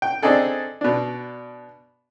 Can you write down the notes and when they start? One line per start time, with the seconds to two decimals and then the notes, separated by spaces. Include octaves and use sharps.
0.02 G5
0.23 C4 D4 D#4 G#4 A4
0.81 B2 D4